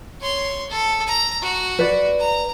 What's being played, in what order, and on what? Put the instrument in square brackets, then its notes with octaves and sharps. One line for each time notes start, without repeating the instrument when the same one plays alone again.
[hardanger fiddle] C#5 C6
A4
A#5
F#4
[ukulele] B4 D5
[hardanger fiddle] A#5